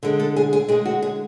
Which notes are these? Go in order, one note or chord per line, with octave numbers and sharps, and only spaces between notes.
D3 G#3 G#4
A4
G#4
G#4
D3 G#3 G#4
F#4
G#4